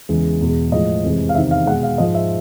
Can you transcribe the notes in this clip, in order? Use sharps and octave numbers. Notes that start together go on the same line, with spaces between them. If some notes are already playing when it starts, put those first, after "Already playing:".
E2 C#3 E3 G#3
E2 B2 G#3
A2 F3 G#3 D#5
F2 C3 E3 G#3
F5
E2 C3 D#3 E5
F5
B2 G#3 F#5
F5
G#2 F3 G#3 D#5
E5